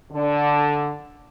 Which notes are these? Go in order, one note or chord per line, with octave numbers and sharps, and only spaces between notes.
D3